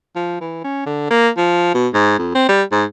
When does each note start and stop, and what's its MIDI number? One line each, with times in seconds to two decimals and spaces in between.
0.16 0.38 53
0.41 0.61 52
0.64 0.86 61
0.86 1.10 50
1.10 1.28 58
1.37 1.74 53
1.74 1.88 47
1.94 2.18 44
2.18 2.34 41
2.35 2.47 60
2.49 2.62 55
2.71 2.84 44